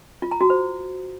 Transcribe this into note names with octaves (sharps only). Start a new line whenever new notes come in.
F4
A#5
F#4
C5